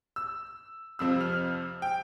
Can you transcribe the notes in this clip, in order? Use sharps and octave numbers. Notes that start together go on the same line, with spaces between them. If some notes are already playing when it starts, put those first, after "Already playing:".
E6
F2 C3 F3 C4 E6
F6
G5